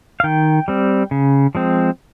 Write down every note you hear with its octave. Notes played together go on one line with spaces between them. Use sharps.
F5
D#3 G5
G3 C4
C#3
F3 G#3 C4